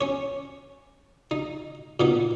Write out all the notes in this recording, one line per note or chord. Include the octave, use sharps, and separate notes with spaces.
C#4 C#5
D#4
A#2 B3 D#4